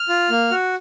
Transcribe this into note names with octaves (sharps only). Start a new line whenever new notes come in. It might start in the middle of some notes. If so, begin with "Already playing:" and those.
Already playing: F6
F4
A#3
F#4